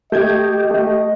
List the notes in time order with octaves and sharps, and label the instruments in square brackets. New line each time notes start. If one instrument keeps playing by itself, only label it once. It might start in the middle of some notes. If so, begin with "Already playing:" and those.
[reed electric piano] A3 G6 G#6 [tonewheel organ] G4 [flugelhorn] D#5
[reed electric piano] A3 [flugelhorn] D#5